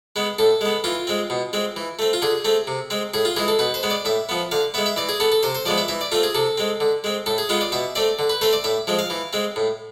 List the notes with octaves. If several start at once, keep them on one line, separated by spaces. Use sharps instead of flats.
G#3 B3
A2 A4
G#3 B3
E3 F4
G#3 C4
B2
G#3 C4
E3
A3 C4
F4
D3 G#4
A3 C4
C3
G#3 C4
A2 G#4
F4
E3 G#3 G#4
A4
B2 B4
C5
G#3 B3
D5
A2 E5
F3 B3
D3 F5
G#3 B3 E5
E5
E3 D5
G#4
B3 A4
A4
C3 C5
C5
F3 G#3 B3 D5
E5
E3 E5
D5
A3 C4 F4
G#4
C3 A4
G#3 C4
D3
G#3 C4
A2 A4
G#4
G#3 B3 F4
D5
B2 E5
A3 C4 D5
D3
B4
A3 C4 C5
D5
A2 E5
F3 G#3 C4
F5
E3
G#3 C4
A2